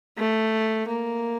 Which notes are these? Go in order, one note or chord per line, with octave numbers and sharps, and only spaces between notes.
A3
A#3